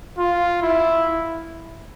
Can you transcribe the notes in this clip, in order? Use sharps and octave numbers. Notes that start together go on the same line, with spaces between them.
F4
E4